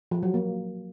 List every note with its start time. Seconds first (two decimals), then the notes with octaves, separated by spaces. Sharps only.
0.11 F3
0.23 F#3
0.34 A#3